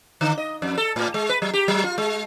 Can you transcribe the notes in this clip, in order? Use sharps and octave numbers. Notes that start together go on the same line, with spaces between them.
D3
D#5
F2
A4
A2
G#3
B4
F#3
G4
F#3
F4
G#3